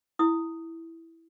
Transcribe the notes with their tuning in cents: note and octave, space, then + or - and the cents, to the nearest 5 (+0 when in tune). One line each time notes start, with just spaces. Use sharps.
E4 +0 D#6 +0